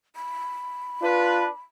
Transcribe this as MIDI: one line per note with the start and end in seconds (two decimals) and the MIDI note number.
0.16 1.59 83
1.02 1.49 62
1.02 1.46 65
1.02 1.49 71